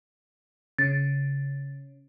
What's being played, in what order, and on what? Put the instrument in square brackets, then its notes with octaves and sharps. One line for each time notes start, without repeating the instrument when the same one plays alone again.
[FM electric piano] C#3 [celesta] A6